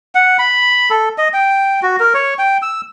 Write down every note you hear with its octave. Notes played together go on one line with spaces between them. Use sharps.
F#5
B5
A4
D#5
G5
F#4
A#4
C#5
G5
E6